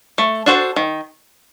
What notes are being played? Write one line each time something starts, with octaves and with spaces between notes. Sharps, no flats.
A3
D4 F#4 A4 C5
D#3